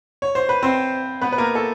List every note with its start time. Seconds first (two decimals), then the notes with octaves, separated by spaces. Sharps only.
0.22 C#5
0.35 C5
0.49 B4
0.63 C4 C5
1.21 B3 B4
1.32 B4
1.38 A#3 A#4
1.55 A3 A4